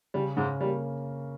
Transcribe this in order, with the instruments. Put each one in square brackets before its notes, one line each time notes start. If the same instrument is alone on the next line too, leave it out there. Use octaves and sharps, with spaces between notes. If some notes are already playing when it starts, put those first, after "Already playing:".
[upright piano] C#3 [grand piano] G3
[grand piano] G#2 G#3 [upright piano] C#3
[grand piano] G3 [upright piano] A#3